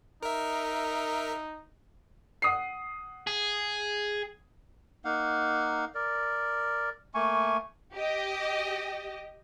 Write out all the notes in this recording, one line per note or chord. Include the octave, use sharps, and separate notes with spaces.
D#4 A#4 E5
F#5 D#6 C7
G#4
A#3 D#4 F5 F#5
A#4 D5
A3 A#3 G#5 C#6
G4 D#5